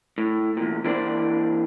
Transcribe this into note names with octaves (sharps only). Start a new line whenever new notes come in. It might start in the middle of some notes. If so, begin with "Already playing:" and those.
A2
E2 A#2
E3 A#3 D4 C5 D5